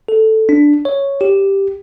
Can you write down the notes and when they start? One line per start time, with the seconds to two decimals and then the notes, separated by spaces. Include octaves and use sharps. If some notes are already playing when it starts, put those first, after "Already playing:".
0.08 A4
0.49 D4
0.85 C#5
1.21 G4